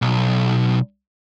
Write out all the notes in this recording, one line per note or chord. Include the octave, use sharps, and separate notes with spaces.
B1